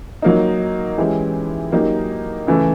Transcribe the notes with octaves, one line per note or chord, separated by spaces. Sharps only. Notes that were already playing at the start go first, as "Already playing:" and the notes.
F#3 A#3 D#4
E3 G#3 C#4 E4 G4
F#3 A#3 D#4 G4
C#3 E3 A3